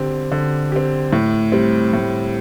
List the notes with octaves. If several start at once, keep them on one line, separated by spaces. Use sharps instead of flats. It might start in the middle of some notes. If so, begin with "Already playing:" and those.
Already playing: D3 C4 G4
D3
C4 G4
A2
G3 C4
A2